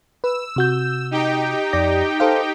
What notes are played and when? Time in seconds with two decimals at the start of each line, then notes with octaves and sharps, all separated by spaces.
0.24 B4 E6
0.56 C3 F#4 G6
1.11 D#4 G4 G5
1.73 F2 D5 A#6
2.20 A4 C5 F5